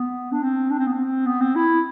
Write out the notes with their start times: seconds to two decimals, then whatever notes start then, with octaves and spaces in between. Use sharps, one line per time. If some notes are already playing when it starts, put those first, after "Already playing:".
Already playing: B3
0.32 D4
0.43 C4
0.71 D4
0.79 C4
0.87 B3
0.94 C4
1.26 B3
1.41 C4
1.55 E4